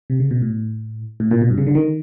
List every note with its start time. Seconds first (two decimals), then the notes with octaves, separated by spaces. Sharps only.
0.10 C3
0.20 C#3
0.31 B2
0.42 A2
1.20 A2
1.31 A#2
1.42 B2
1.50 G2
1.58 C#3
1.67 D3
1.75 D#3